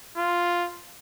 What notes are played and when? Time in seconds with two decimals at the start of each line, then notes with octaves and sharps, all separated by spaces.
0.17 F4